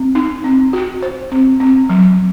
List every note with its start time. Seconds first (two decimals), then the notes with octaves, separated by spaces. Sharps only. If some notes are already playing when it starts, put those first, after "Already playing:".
Already playing: C4
0.15 D#4
0.44 C4
0.73 F#4
1.03 C5
1.32 C4
1.60 C4
1.89 F#3